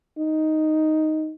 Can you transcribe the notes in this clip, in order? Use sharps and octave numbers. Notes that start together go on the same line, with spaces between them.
D#4